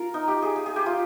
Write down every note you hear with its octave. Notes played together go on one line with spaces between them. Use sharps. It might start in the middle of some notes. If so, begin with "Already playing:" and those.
Already playing: F4 A#4
D#4
G4
G#4
G#4
G#4
G4
F4